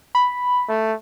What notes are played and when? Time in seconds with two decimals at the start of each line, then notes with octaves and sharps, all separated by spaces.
0.15 B5
0.69 A3